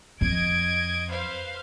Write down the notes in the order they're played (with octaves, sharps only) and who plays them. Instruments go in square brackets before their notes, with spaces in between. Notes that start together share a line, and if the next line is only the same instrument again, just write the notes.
[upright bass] F2 [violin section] D#5 G#6 D7
[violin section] B4 C5 F5